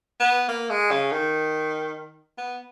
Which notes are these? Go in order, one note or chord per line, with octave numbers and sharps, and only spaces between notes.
B3
A#3
G#3
C#3
D#3
B3